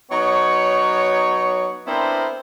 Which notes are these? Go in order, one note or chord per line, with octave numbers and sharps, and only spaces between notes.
F#3 B3 D#4 C#5
B3 C4 D4 E4 A#4 C5